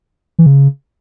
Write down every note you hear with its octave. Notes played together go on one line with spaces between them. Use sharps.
E3
C#3